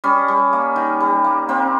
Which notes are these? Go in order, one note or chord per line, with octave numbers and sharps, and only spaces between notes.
G3 C#4
G3
A#3
D#3
G3
A#3
A#3 C4